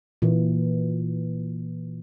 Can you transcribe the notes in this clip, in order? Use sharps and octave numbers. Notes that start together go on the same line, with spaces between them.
A#2 E3